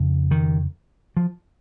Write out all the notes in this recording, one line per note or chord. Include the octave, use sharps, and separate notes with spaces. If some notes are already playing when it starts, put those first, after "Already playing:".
Already playing: F2 C#3
D#3
F3